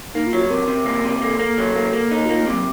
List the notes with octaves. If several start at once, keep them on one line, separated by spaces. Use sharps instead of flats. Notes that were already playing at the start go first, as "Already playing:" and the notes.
A#3 D#4
F4
F#3
F#4
C3 A#4
C3
A#3
C3
A#3 A4
A#3
F#3
A#3
A#3
D#4
F#4
A#3 F4
A3
C3
F#3